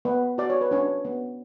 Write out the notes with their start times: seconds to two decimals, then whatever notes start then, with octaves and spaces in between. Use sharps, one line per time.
0.05 B3 B4
0.38 F#4 D5
0.50 C#5
0.61 B4
0.71 C#4 D4 C#5
1.05 B3